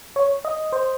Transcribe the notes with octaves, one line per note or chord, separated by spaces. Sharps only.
C#5
D#5
C5